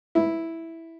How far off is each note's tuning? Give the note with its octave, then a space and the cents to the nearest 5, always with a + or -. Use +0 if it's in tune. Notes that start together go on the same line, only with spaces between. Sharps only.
E4 -5